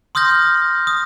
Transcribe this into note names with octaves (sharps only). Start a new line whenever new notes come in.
C6 D#6 F6 G6 A#6
D#6